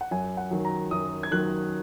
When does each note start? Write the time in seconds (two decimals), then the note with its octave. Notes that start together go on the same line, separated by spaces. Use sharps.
0.01 F#5
0.11 F#2 G#5
0.37 F#5
0.51 D#3 F#3
0.65 A#5
0.91 F#2 D#6
1.23 G#6
1.31 D#3 F#3 F#6